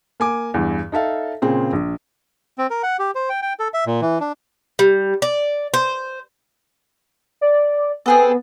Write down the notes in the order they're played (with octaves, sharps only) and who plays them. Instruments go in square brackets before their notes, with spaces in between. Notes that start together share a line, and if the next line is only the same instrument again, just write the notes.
[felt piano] A#3 G#5 D6
E2 G2
D#4 A4 E5 F5
A#2 C#3 C4 G#4
A#1
[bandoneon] C4
A#4
F#5
G4
C5
G5
G5
A4
E5
A#2
E3
D4
[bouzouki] G3
D5
C5
[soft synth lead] D5
[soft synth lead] B3 [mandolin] C4 G#4 A4